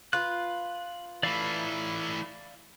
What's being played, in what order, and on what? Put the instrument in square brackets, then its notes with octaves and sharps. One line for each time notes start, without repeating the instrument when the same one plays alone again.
[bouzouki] F4 B4 [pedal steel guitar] F#6
[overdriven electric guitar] E3 A3 [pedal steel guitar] D5 F5 B5